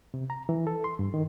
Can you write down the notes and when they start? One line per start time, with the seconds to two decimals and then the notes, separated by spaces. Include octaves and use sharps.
0.14 C3
0.30 A#5
0.49 E3
0.67 A4
0.84 C6
0.99 G2
1.14 D#3